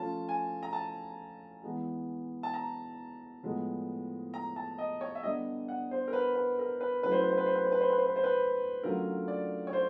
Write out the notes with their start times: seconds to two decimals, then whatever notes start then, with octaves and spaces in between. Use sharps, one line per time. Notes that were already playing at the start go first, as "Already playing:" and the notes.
Already playing: F3 A3 C#4 F4 A5
0.29 G#5
0.63 A#5
0.73 A5
1.63 E3 G#3 B3
2.43 A5
2.54 A#5
3.43 A2 F3 G#3 B3
4.34 A#5
4.56 A5
4.78 D#5
5.01 C#5
5.15 E5
5.23 D3 G3 B3 D4 D#5
5.68 F#5
5.91 C5
6.08 A#4
6.13 B4
6.35 B4
6.59 A#4
6.81 B4
7.03 F#3 A3 C#4 E4 B4
7.12 C5
7.21 B4
7.30 C5
7.38 B4
7.46 C5
7.55 B4
7.64 C5
7.72 B4
7.81 C5
7.90 B4
7.98 C5
8.06 B4
8.16 C5
8.24 B4
8.83 D3 F#3 A3 C#4 F4 A#4
9.28 D5
9.67 C#5
9.73 C5